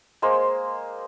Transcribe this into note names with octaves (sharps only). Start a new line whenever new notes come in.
G#3 A#3 C5